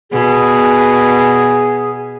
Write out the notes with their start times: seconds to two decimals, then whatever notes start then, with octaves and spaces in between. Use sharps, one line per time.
0.11 B2 G#4